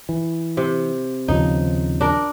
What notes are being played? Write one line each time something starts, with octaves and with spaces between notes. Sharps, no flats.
E3
C3
D#2 C#3 F3 D#4
D4 A#4